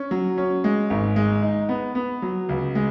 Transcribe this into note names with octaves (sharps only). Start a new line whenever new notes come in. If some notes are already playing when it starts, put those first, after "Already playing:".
Already playing: C#4
F#3
C#4
G#3
G#1
G#3
D#4
B3
B3
F#3
C#2
G#3